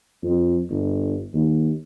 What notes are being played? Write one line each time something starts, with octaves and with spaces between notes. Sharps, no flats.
F2
G1
D#2